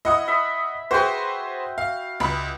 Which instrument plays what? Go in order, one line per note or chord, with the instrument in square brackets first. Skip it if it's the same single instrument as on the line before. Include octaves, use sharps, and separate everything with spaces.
[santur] E4 [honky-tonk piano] D#5 F#5 D#6
[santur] E5 B5
[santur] F#4 G5 [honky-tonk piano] G#4 B4 C5
[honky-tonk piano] F5
C#2 B5